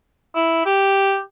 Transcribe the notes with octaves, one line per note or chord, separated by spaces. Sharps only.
E4
G4